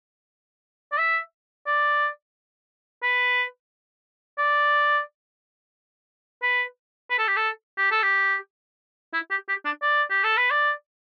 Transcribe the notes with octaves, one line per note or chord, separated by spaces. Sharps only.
D5
E5
D5
B4
D5
B4
B4
A4
G4
A4
G4
A4
G4
E4
G4
G4
D4
D5
G4
A4
B4
D5